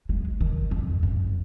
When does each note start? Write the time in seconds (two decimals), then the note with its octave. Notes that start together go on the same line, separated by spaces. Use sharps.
0.09 G#3
0.41 D#3
0.71 F2
1.03 F#2